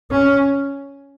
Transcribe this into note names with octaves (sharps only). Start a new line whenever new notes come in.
C#4